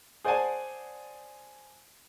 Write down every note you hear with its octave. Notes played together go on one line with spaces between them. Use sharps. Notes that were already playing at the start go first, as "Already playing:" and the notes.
G#4 C5 D5 F#5 G#5 A5